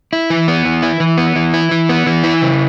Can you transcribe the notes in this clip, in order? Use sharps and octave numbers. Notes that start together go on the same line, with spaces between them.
E4
E3
B3
E3
E4
E3
B3
E3
E4
E3
B3
E3
E4
C#3